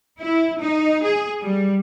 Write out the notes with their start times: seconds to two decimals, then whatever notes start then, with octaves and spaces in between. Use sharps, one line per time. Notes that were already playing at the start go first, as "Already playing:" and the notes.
0.20 E4
0.59 D#4
1.04 G#4
1.42 G3